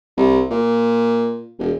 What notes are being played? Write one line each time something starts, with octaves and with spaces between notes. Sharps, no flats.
C2
A#2
E1